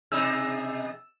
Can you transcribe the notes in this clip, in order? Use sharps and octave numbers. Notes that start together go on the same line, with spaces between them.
B2 D#4 G#4 E6